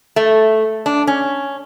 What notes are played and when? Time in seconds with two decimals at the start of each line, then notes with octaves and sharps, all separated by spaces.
0.16 A3
0.86 D4
1.07 C#4